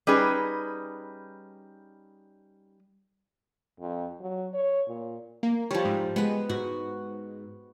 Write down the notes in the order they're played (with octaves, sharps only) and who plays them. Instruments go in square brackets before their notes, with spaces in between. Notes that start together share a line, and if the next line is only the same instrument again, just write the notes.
[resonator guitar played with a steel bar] G3 C#4 D#4 G#4 B4
[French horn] F2
F#3
C#5
A#2
[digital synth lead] A#3
[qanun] F3 G3 [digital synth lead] C#5
[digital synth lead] G#2
[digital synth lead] G#3 [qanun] B3 B4
[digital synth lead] G#2 [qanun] F#4